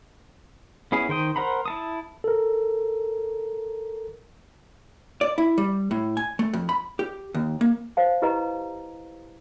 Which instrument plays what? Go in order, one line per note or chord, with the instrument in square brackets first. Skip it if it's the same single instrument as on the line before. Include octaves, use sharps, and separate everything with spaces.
[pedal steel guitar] B3 C#4 E4 G#4
D#3 C5 G5 D#6
A#4 C5 F#5 A#5 B5
E4 A5 D#6
[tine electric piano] A4 A#4
[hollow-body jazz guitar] D5
E4
G3
A2
G#5
A3
F2
B5
G4
D#2
A#3
[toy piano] C5 D5 F5 A5
E4 G4 B4 D#5 A#5